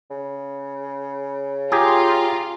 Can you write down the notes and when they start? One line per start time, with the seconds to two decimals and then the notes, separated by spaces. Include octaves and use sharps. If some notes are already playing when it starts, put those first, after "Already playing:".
0.10 C#3
1.72 F4 G4 G#4 A#5